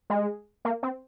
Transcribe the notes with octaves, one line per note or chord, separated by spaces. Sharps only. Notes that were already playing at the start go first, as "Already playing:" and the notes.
G#3
A#3
C4